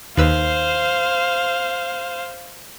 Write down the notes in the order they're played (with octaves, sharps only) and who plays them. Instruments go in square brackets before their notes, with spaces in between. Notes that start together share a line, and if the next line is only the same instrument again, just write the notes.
[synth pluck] D#2 B4 E6 [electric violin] C5 F5